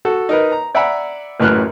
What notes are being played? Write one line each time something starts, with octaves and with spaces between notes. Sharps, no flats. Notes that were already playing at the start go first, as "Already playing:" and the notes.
F#4 A4
D#4 A#4 B4
A#5
D5 E5 F#5 G#5 A#5 B5
A1 F#2 A2 B4 F6 F#6